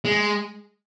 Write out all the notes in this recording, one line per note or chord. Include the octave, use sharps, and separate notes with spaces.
G#3